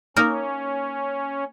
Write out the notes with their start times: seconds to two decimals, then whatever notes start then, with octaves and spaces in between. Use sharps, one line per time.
0.16 A#3 C#4 D#4 A#4